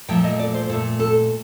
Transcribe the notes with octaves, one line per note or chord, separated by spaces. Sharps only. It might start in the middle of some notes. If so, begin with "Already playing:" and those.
A#2 F3 A3 G5
D#5
D5
C5
A#2 A3 A4
A4